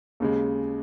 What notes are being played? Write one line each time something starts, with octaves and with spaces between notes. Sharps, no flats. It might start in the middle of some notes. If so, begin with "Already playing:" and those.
D#2 C#3 G#3